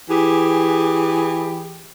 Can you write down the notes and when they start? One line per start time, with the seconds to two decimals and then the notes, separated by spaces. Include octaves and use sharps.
0.09 E3 G4 G#4